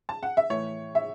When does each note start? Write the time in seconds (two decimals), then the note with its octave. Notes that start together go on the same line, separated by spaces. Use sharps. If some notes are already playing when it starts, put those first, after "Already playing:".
0.09 A5
0.23 F#5
0.37 E5
0.50 A2 E3 A3 C#5
0.95 E5